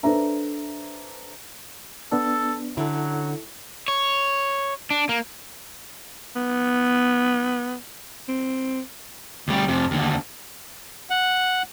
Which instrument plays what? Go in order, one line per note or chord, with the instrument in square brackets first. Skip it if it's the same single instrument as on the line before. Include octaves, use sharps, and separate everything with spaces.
[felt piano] D4 A4 B4 C5 E5 A#5
[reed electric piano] B3 D4 [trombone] A4
[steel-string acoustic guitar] D3 C#4 [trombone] F#3 [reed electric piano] E4 A4
[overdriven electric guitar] C#5
D4
A#3
[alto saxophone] B3
C4
[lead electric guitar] D2 G3
F2 C3
D#2 D3
[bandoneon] F#5